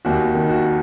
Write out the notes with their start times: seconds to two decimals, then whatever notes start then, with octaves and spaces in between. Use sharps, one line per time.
0.05 D#2 F#4
0.35 D#3
0.49 F#4